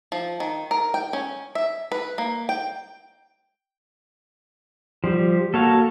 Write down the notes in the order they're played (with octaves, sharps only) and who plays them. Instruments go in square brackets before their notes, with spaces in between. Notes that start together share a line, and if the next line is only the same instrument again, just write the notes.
[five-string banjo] F3
D#3
A#4
G5
C#4
E5
B4
A#3
G5
[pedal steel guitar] F3 G3 [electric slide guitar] G4
[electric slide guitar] A#3 F#4 A5 [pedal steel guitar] A4 C#5 F5